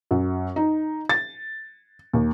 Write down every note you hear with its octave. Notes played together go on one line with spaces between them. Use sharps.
F#2
D#4
A6
D#2